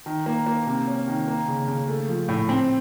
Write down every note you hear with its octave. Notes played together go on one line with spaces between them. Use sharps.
D#3
A#3
A#3
C3
C#4
D#3
A#3
C#3
C#3
A3
F3
A2
C4